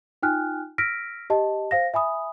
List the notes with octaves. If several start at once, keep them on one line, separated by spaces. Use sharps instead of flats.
D#4 F4 G5 G#5 F6 F#6
E6 F6 A#6 B6 D7
G4 D#5 A5
C5 F5 A#6
E5 G#5 B5 D#6